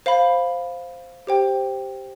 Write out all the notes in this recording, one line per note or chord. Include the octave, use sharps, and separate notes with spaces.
C5 F5 B5
G4 C5 G5